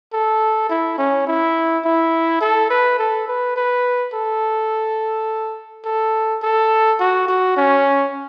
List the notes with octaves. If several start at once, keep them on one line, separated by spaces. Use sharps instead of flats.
A4
E4
C#4
E4
E4
A4
B4
A4
B4
B4
A4
A4
A4
F#4
F#4
C#4